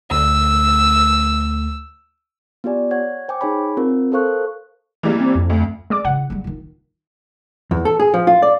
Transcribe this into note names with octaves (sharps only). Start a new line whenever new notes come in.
D2 A3 E6
B3 F4 G4 D5 G#5
C#5 F#5 G#6
C5 G5 G#5 D6
D#4 G#4 C#5 G#5 B5
C4 F4 A#4
A4 A#4 C5 F5 C#6 F#6
E3 G3 A#3
C4
F2
D2
G#3 D5 D6
C#3 E3 F#5
G3 G#3
D#3 F4
E2
A4
G#4
F3
F4
D5